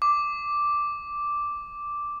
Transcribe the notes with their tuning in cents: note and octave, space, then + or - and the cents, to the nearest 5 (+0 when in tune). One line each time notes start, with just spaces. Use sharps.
D6 +0